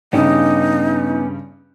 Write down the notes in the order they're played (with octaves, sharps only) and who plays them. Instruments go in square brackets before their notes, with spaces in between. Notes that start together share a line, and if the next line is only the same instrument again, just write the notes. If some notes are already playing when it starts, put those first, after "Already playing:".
[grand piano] G2 C#3 [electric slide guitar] B3 C#4 G4 [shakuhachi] D#4